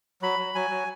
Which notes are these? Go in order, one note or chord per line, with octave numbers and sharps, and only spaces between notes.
F#3 B5
F#3
F#3 G#5
F#3